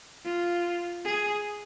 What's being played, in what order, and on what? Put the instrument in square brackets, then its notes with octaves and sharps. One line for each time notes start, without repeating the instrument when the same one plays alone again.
[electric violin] F4
G#4